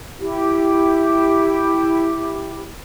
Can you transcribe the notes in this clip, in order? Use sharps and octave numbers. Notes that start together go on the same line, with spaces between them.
E4 G4